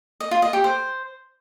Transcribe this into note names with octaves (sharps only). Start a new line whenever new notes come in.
D#5
F4
D#5
G4
C5